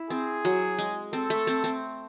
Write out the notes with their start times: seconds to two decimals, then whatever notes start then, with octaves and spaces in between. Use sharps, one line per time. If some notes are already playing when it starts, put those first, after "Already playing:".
Already playing: E4
0.10 C4 G#4
0.45 F#3
0.79 G#3
1.12 C4 A4
1.30 A3
1.47 C4
1.64 C4